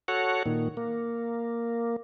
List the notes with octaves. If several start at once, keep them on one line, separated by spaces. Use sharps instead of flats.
F#4 A4 C#5 F#5
A#2 D#3
A#3